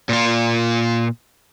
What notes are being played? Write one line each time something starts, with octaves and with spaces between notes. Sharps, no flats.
A#2 F4